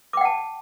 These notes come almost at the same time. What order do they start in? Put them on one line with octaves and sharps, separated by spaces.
D6 G5 F#5 A5